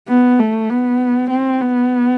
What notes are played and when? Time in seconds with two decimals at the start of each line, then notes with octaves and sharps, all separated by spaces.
0.09 B3
0.39 A3
0.70 B3
1.31 C4
1.61 B3